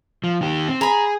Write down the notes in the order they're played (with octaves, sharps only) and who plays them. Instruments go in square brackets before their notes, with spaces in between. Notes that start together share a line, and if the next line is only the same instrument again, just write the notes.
[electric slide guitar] F3
D#3 G4
C4
[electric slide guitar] G#4 [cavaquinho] A#5 B5